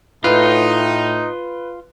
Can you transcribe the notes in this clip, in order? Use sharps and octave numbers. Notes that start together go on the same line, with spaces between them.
A2 D#4 F4 B4